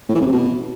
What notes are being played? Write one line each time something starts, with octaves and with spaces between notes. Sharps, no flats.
A2
E3
F2
C3
B2